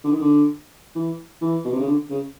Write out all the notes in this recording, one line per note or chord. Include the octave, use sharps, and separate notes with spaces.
D3
D#3
D3
E3
E3
B2
C3
C#3
D3
C#3